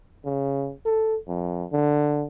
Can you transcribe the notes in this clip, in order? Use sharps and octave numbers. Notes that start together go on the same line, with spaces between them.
C#3
A4
F2
D3